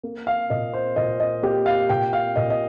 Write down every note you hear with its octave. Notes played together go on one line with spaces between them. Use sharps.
A#3
F5
A#2 D#5
C5
A#2 D#5
D#5
A#3 G4
F5
A#2 G5
F5
A#2 D#5
D#5